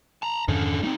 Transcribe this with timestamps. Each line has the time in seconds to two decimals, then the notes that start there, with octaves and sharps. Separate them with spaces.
0.22 A5 A#5
0.48 F2 G#2 D3 D#3 C#4
0.83 G3 A3 C4 D#4